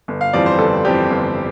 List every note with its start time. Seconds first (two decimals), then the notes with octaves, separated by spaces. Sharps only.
0.08 G1
0.21 F5
0.33 F2 E3 G3 C4 D5
0.46 C5
0.59 G1 A4
0.85 F2 E3 G3 C4 G4
1.10 G1